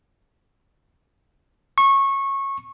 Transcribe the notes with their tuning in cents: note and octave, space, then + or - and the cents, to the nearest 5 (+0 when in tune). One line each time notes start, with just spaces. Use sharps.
C#6 -20